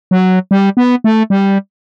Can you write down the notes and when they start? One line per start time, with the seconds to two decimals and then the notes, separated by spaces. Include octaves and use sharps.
0.11 F#3
0.51 G3
0.77 B3
1.04 A3
1.30 G3